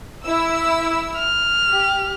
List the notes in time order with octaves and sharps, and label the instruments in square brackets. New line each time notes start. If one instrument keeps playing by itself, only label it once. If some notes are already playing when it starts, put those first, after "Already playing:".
[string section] E4 E6
[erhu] F6
[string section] G4